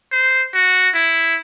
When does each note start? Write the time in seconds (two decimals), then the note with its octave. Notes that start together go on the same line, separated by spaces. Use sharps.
0.11 C5
0.54 F#4
0.94 E4